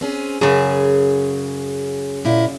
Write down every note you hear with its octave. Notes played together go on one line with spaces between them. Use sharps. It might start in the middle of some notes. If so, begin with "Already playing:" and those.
C4 C#4 G#4
F#2 C#3 G#4
A#2 E4